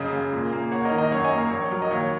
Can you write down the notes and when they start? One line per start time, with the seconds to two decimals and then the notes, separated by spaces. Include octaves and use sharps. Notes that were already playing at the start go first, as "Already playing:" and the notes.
Already playing: F#2 C#3 D#5
0.13 C#3
0.32 A#2
0.53 A#3
0.71 A#3 C#5 F#5
0.85 A#4 D#5
0.91 D#3
0.98 A#4 D#5
1.11 F#2 C#5 F#5
1.24 D#5 G#5
1.32 A#3
1.38 A#4
1.51 A#1 C#5
1.71 F#3 A#4
1.82 D#5
1.91 D#2 C#5